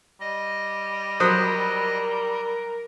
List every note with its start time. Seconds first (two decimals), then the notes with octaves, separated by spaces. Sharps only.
0.20 G3 D#5
1.20 F#3 A#4 C5 D#6